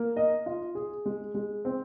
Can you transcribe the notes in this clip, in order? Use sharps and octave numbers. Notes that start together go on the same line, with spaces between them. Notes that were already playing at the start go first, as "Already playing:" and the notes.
Already playing: A#3
D#5
F4
G#4
G#3
G#3
C4